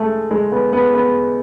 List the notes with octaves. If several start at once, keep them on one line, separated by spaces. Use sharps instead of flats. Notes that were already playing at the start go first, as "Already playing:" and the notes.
Already playing: G#3 A3
G#3
B3
B3
B3